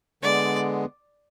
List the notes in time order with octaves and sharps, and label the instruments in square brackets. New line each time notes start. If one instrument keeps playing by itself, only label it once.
[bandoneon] D3 G#3 B3 [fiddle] D5